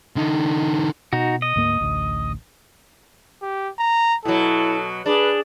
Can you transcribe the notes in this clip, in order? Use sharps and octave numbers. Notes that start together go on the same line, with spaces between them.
D3 D#4
B2 D#4 F#4
D#5
D2 G#2 A#3
A1 D2
G4
A#5
B2 F#3 E4 A4
D4 G#4 B4